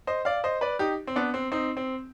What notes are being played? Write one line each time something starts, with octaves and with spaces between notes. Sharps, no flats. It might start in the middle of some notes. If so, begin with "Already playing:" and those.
C5 D#5
D5 F5
C5 D#5
B4 D5
D#4 G4
C4
B3 D4
C4
C4 D#4
C4